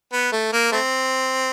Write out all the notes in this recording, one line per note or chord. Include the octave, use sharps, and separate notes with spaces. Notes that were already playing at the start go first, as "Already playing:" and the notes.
B3
A3
A#3
A3 C4